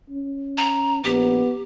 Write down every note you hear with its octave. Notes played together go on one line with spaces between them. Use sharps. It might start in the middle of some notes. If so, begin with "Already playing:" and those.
C#4
A#5
A#1 B3 G4